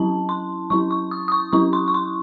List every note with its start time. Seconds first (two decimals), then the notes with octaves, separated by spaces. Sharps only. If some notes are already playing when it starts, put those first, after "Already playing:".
Already playing: F#3 C#4 E4 A5
0.29 C6
0.70 F#3 C#4 E4 C#6
0.91 C#6
1.11 D#6
1.28 D#6
1.32 C#6
1.53 F#3 C#4 E4 C#6
1.73 C6
1.88 C#6
1.94 C6